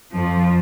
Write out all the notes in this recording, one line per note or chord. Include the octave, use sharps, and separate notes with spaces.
F2 F3